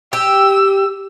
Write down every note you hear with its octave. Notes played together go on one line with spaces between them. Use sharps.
G4 E6